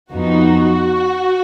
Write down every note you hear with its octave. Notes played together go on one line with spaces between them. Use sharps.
F2 F3 B3 D#4 F#4